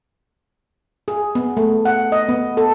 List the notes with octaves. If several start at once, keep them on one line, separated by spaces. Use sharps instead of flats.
G#4
B3
A3
F#5
D#5
B3
A4